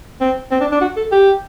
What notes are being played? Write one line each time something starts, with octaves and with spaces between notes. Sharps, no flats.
C4
C4
D4
D4
F#4
A4
G4